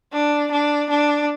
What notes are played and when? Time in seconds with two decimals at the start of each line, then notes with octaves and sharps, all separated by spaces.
0.13 D4
0.52 D4
0.90 D4